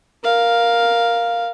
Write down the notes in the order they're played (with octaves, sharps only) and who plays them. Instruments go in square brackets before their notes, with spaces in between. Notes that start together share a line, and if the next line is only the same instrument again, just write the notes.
[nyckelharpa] A#4 F5